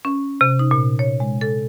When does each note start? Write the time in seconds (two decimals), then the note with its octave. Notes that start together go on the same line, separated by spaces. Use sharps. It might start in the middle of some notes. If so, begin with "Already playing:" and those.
0.05 C#4
0.41 C3
0.59 D#4
0.71 A#2
0.99 C#5
1.20 G#3
1.41 A4